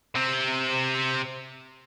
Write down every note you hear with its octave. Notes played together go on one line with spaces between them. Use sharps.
C3 C4